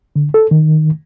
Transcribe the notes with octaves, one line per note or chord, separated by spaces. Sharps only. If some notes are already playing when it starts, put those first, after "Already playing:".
D3
A4
D#3